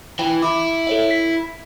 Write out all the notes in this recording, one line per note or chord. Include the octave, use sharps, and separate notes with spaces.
E3 G5
E4 D6
A4 C#5 E5
B6